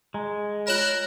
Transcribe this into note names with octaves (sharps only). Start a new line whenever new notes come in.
G#3 A#5
F4 A#4 C#5 B5 F#6 E7